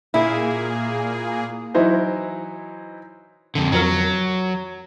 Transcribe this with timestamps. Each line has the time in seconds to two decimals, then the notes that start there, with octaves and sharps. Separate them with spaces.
0.14 A#2 A#3 E4 G#4
1.74 E3 F#3 D#4 E4 C5
3.55 F2 D3
3.72 F2 F#3 A#4